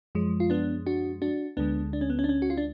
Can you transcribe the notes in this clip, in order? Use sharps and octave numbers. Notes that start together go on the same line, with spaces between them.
F#2 F3 G#3
F4
B3 D4
D4 F#4
D4 F#4
D2 D3 G#3 B3 D4
D4
C#4
B3
C#4
D4
C#4
F#4
F4
D4